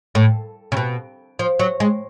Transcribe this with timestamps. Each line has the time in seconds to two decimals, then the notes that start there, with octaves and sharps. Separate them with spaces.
0.15 A2
0.72 C#3
0.77 B2
1.39 F3
1.59 F#3
1.80 G#3